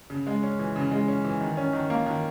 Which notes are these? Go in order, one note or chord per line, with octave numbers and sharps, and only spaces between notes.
C#3
G#3
C#4
E3
C#3
G#3
C#4
E3
D#3
C#4
D#3
A#3
D#3